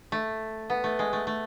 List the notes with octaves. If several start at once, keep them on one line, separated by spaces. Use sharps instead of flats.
A3
B3
A3
G#3
A3
A3